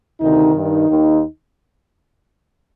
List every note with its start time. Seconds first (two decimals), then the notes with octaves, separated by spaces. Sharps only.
0.21 D2 C3 D#3 D#4
0.54 G2 D#3 D#4
0.88 D#2 D#3